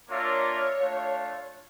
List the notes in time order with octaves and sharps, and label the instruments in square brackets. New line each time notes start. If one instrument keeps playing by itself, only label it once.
[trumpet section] A#3 D4 F4 A#4 E5 [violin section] C#5
[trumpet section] A3 D4 F4